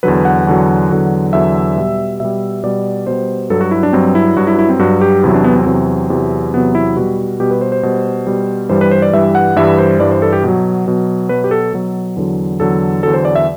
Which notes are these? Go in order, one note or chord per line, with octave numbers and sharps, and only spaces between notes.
E2 D3 F#3 B4
F#5
E2 D3 F#3
E2 D3 F#3
E2 D3 F#3 E5
B2 G3
B2 G3 E5
B2 G3 D5
B2 G3 C5
G2 F#3 A4
F#4
E4
D4
G2 F#3 C4
E4
G2 F#3 F#4
E4
E4
C4
G2 F#3 F#4
G4
E2 C3 F#3 E4
D4
B3
C4
E2 C3 F#3
E2 C3 F#3
E2 C3 F#3 B3
E4
B2 G3 F#4
B2 G3 G4
B4
C5
C5
B2 G3
B2 G3
G2 E3 G3 C5
B4
C5
D5
G2 E3 G3 E5
F#5
G2 E3 G3 E5
C5
G2 E3 G3 D5
C5
A4
G4
B2 F#3
B2 F#3
B2 F#3 B4
G4
A4
B2 F#3
E2 D3 F#3
E2 D3 F#3 A4
E2 D3 F#3 A4
C5
D5
E5